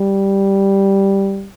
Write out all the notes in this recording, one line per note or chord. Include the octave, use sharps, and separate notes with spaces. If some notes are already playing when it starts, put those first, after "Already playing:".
Already playing: G3